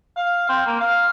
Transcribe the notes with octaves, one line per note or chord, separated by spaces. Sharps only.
F5
C4
A#3
F5